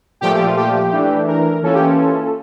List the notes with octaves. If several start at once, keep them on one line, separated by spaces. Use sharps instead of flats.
A#2 F3 A3 G4
G4
F4
G4
E3 A3 D4
A#4
E3 A#3 C#4 F4 A4
G4
A4